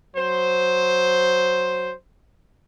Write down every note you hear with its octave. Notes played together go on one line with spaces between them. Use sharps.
F#3 C5